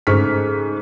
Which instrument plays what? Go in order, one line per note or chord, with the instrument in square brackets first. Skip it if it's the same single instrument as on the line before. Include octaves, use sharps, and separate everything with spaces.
[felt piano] G#2 C#3 A3 C#6 F6 B6